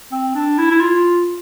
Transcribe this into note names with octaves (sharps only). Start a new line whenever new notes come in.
C4
D4
E4
E4
F4